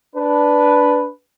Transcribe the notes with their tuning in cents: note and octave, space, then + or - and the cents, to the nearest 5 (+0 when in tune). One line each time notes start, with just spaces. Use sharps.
D4 -5 B4 +0